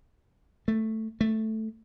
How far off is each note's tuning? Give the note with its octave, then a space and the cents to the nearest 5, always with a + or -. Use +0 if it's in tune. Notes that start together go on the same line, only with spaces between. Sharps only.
A3 +5
A3 +0